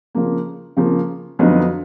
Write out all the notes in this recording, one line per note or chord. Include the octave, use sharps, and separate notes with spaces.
C#3 F3 A#3
C#3 F3 A#3
F2 D3 F#3 B3 D#4